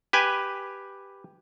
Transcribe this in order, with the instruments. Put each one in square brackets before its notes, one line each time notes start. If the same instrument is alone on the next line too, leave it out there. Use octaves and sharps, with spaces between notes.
[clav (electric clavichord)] G4 B4 G#5